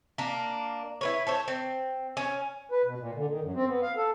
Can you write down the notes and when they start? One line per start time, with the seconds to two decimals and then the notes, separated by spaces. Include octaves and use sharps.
0.18 A#3 D4
1.01 E4 B4 C#5
1.27 A4 C5 C#5
1.48 C4
2.17 C#4
2.72 B4
2.85 B2
2.99 A#2
3.15 D3
3.28 D#3
3.42 F#2
3.54 C4
3.67 B3
3.82 F5
3.96 A4